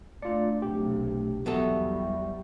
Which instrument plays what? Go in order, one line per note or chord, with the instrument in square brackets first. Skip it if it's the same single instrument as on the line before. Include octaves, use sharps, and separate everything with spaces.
[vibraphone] A3 D4 [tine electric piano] F4 D5
[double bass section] B1 C3 [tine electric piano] G4
[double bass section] E2 G3 [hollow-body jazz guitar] F#3 B3 A4 [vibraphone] E5 C#6